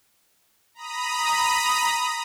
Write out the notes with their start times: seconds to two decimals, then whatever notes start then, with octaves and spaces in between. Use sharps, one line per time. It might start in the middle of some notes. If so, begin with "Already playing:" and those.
0.74 A#5 B5 D#6